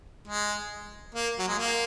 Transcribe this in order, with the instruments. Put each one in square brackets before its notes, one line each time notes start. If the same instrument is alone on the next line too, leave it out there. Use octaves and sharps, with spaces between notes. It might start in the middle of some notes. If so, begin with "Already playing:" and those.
[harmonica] G#3
A#3
F#3
G#3
A#3